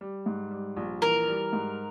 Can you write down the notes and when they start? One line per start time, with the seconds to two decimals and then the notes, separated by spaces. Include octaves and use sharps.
0.01 G3
0.26 G#2
0.51 G3
0.77 A#1
1.02 E3 A#4
1.28 G3
1.53 G#2